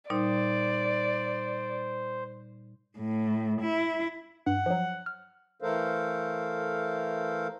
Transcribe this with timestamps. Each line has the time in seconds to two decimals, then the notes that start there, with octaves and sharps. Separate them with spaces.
0.10 A#2 G3 D#4 C5 D5
2.98 A2
3.62 E4
4.47 G2 F#5
4.66 F3 F#3
5.06 F6
5.62 E3 A3 A4 A#4 C5 F5